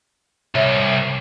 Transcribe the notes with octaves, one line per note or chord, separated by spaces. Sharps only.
C2 C#5 E5